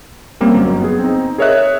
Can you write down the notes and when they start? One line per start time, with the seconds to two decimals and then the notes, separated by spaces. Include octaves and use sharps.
0.40 G3 A#3 C4 C#4
0.54 G1 F#3
0.81 B3 G#4
0.99 C4 D#4
1.38 G#4 A#4 C#5 D#5 E5 F#6